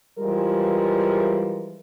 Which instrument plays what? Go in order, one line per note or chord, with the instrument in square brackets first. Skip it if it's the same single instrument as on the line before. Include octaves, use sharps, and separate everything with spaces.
[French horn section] E3 F3 G3 G#3 A#4